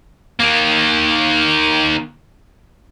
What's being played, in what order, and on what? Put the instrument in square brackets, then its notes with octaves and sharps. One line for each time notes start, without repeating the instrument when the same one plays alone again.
[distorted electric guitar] D#3 A#3